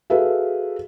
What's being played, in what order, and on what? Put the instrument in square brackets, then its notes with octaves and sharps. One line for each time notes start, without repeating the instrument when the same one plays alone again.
[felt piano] F#4 G#4 A4 B4 E5 F5